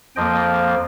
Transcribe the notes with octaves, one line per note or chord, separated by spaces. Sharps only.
F2 F3 A#3 D#5 G5